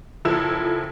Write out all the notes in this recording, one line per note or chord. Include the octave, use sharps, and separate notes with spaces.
F#1 F3 E4 A4 E7